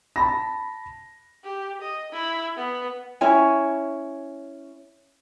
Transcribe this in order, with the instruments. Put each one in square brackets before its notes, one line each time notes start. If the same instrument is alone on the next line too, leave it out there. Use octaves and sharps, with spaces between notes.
[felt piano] A5 B5 A#6
[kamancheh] G4
D#5
E4
B3
[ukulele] C#4 E4 C#5 G#5